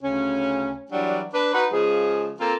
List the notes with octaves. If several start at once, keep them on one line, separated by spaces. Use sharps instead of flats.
D2 C#3 C#4
E3 F#3 G3 D4
D4 B4
D#4 F#4 B4
C#3 F3 G#3 G#4
A#3 C4 F4 A4 A#4